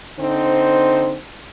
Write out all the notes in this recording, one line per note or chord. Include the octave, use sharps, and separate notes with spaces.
D3 C4 D#4 C5